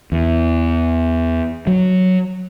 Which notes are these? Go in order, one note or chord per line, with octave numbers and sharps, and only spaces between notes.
E2
F#3